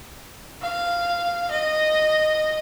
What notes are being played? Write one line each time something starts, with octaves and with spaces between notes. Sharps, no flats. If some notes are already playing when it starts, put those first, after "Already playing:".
F5
D#5